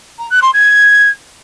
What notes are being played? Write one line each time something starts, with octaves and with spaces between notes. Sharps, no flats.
A#5
F#6
C6
G#6